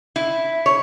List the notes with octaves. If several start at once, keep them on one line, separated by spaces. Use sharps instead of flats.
E4
C#5